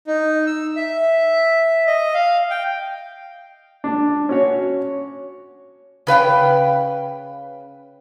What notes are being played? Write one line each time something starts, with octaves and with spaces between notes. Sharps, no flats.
D#4
E6
E5
D#5
F5
G5
D4
C#4 F#4 C#5
C#3 B4 F5 G5